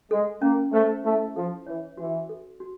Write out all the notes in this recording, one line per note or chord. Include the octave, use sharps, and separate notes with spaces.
G#3 A4
A#3 C#4
A3 C5
A3 E4
F3 A4
E3 C#5
E3 F#4
A4
F#4